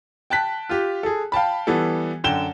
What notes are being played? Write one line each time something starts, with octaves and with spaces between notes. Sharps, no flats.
G5 A5 F#6 B6
F4 G4
G#4 A4
F5 G5 A5 B5
E3 G3 B3 A4
F#2 D3 G5 E7 G7